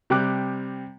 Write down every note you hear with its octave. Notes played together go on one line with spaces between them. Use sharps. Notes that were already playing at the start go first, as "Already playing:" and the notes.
C3 G3 G5 D6 F#6